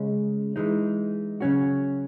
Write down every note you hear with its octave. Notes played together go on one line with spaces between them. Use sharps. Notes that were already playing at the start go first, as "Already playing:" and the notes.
Already playing: C#3 G#3 C#4
E3 G#3 D#4
C#3 F#3 C#4 F#4